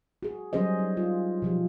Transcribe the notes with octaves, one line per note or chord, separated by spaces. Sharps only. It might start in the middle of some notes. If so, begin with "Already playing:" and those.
F#4 G#4
F#3 G3 C#4 G#4 C5 D#5
D#4
F4
B2 F3 G4